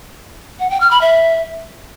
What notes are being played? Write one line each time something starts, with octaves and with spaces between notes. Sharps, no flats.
F#5
G5
F6
B5
E5